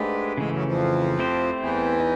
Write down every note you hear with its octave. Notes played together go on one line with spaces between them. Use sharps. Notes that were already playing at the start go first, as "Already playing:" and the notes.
Already playing: G#2 G#3 A3 D4 G4 B4
G#2 C#3 E3 G#3 A3
F#2 F#3
F2 F3
A3 C4 E4 G4 C5
E2 E3
D#4